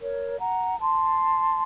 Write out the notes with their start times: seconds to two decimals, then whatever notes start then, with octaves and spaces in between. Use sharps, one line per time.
0.01 A#4 C#5
0.39 F#5 A#5
0.79 A5 C6